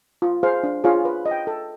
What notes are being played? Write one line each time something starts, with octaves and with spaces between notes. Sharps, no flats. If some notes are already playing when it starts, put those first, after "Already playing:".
F4
G#4 C5 F5
D4
F4 G#4 C#5 F5
B4
D#5
G5
A4